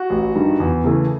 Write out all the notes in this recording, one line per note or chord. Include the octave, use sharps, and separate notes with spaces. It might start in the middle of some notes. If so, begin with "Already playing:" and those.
Already playing: F#4
A1
G2 D#3
E2
C#3 E3 A3